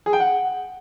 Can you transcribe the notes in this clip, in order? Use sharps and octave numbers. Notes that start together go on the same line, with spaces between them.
G#4
G5
F#5